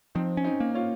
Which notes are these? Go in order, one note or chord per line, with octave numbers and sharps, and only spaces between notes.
F3 C4 D#4
C#4
C4 D#4
A#3
C#4 F4